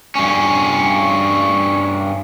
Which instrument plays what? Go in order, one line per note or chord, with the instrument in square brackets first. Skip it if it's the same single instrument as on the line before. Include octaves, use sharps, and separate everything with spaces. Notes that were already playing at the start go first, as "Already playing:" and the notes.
[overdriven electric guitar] G2 C#4